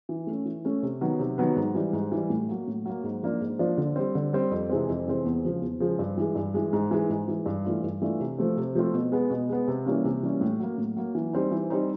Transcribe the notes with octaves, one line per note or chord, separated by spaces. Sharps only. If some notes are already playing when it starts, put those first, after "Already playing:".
E3
A3 C#4
E3
A3 C#4
C3
D#3 F#3 B3
C3
D#3 F#3 B3
G#2
E3 G3
G#2
E3 G3
A2
F#3 A#3
A2
F#3 A#3
G#2
F3 A#3 D4 F4
G#2
F3 A#3 D4 F4
D3
G3 C4
D3
G3 C4
F2
C3 E3 G#3 C4
F2
C3 E3 G#3 C4
E2
C#3 F3 G#3
E2
C#3 F3 G#3
G2
E3 G#3
G2
E3 G#3
G#2
E3 G#3
G#2
E3 G#3
G2
E3 A3 D4 F4
G2
E3 A3 D4 F4
C3
F3 A3 C4
C3
F3 A3 C4
B2
G#3 B3
B2
G#3 B3
C3
E3 G3 A#3 C#4
C3
E3 G3 A#3 C#4
A2
F#3 A#3
A2
F#3 A#3
E3
G3 C4 D#4
E3
G3 C4 D#4